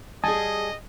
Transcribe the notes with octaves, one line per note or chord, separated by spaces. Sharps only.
G3 G#4 D#5 G#5 A5 D#6